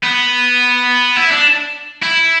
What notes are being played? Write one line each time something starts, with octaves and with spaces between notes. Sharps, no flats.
B3
E4
D4
E4